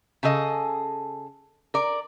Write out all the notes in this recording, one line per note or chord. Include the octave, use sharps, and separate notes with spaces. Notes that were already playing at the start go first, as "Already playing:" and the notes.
C#3 G#4 A4 D#5
A#4 D5